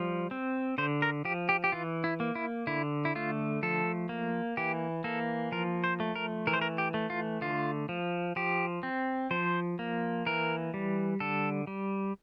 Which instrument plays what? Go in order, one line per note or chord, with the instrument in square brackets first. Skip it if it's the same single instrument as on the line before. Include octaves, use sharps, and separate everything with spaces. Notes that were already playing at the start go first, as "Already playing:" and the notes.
Already playing: [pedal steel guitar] F3 G3
C4
D3 C5
A#4
F3 G4
G4
G4
E3 F4
E4
A#3
E4
D3 E4
E4
A3 F4
F3 A4
A#3
E3 G4
A#3 A4
F3 A#4
C5
A3
A#4
E3 A#4
C5
A#4
G4
A3
F4
D3 F4
F3
F3 G4
C4
F3 C5
A#3
E3 A#4
G3
D3 A4
G3